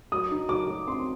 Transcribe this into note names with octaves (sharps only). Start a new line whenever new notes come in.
F#3 D#6
D#4
F#3 D6
F#3
C4 C6